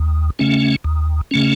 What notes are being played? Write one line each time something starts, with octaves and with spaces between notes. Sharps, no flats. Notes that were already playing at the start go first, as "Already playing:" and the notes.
Already playing: D#2
C#3 A3 C#4
D#2
C#3 A3 C#4